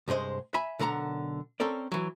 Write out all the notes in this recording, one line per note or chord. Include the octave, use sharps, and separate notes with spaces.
C2 G2 G#3 C5 D#5
E5 G#5 B5
B1 D3 A#4 F#5 A#5
C4 C#4 A4 A#4 D5
E3 F#3